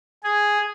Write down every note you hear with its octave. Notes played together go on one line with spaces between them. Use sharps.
G#4